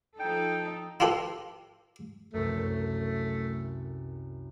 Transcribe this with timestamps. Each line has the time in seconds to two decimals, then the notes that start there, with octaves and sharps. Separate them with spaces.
0.20 F3 D#4 A4 G5
1.00 E4 F4 G4 A4 B4
2.34 C2 F#2 A3